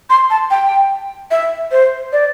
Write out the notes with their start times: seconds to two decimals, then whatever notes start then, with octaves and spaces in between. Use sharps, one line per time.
0.10 C6
0.30 A5
0.51 G5
1.31 E5
1.71 C5
2.13 D5